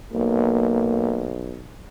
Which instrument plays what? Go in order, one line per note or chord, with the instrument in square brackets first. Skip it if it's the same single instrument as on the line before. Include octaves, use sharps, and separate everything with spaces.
[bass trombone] B1 [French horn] A#3